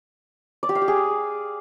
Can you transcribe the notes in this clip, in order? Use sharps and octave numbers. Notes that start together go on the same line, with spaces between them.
D5
G4
F5
G4
G#4